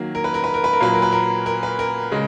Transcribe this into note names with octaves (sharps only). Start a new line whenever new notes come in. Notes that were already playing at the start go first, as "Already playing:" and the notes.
Already playing: D#3 F#3 A#3
A#4
B4
A#4
B4
A#4
B4
A#4
A#2 F#3 A#3 B4
A#4
B4
A#4
A#4
B4
A#4
C#3 G#3